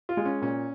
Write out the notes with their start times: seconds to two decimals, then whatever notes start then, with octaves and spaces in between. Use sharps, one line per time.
0.09 F4
0.17 G#3
0.25 C#4
0.42 A#2 C#4